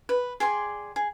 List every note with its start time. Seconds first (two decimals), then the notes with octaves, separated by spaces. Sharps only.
0.09 B4
0.40 G#4 D5 G5 C6
0.96 G#4